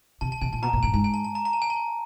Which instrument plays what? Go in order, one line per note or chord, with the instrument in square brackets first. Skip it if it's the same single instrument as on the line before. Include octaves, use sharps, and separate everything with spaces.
[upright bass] C3 [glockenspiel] A5
[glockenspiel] A5
[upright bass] C3 [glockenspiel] G#5
[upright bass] A#2 [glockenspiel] A5
[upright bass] B2 [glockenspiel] A#5
[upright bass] A#2 [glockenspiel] A5
[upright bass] A2 [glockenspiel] G#5
[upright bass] G#2 [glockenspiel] G#5
[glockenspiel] G#5
A5
A5
A#5
A#5
A5
G#5
A5